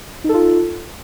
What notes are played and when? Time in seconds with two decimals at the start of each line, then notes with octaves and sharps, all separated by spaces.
0.24 D#4
0.29 A4
0.34 F4